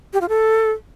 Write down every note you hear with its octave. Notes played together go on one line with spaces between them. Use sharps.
G4
F4
A4